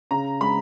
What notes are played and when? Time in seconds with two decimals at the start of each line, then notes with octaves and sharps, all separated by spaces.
0.11 C#3 A#5
0.40 G#3 B5